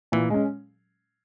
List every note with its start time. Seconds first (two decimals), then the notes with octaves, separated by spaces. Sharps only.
0.12 A#2 E3
0.30 G#3 C#4